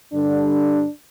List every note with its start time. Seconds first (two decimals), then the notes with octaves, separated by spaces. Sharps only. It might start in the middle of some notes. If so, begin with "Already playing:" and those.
0.13 G2 D3 G3 D4